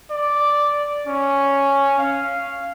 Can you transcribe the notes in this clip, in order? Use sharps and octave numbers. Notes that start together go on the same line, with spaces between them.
D5
C#4
F5